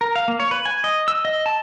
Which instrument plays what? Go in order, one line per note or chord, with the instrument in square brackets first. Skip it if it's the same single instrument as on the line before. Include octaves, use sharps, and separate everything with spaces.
[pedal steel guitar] A#4
F5
A#3
C#5
B4
G#5
D#5
E6
D#5
A5